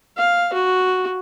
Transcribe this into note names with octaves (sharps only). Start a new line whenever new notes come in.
F5
F#4